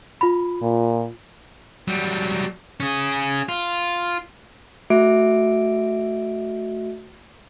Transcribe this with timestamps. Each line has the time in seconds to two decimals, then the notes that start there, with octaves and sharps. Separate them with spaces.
0.21 F4 B5
0.62 A#2
1.88 F#3 G3
2.80 C#4 G#4
3.49 F4
4.90 A3 F#4 E5 D7